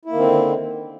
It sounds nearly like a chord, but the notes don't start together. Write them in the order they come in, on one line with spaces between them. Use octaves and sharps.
E4 A#3 D#3 C4 D3